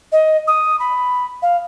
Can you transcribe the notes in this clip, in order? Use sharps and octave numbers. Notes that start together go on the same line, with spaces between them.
D#5
D#6
B5
F5